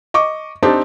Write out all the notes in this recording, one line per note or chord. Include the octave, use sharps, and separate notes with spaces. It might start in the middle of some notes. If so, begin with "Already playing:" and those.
D#5 C#6 D6
C4 D4 D#4 G4 A5